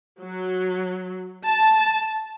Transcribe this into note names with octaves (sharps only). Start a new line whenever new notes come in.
F#3
A5